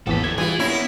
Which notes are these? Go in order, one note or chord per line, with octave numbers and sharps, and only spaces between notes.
A1 E2 A#2 F3 A4 B6
D2 A3 G#6
E3 G3 F4 G#4
A#3 B3 C#4 E4